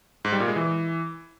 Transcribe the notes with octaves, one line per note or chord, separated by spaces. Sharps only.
G#2
G3
A#2
G#3
E3